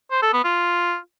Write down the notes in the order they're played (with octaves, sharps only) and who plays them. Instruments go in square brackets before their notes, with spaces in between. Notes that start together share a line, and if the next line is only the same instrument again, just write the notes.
[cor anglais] C5
A4
B3
F4